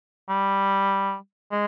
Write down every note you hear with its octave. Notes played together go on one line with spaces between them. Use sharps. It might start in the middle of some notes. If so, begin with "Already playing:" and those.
G3
G#3